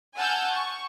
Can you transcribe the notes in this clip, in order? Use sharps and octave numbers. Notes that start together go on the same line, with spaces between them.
F#5 G#5 A5 E6 F6 G6
C#6